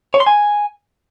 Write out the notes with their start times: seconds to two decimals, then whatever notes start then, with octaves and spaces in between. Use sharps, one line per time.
0.14 C#5
0.20 C6
0.26 G#5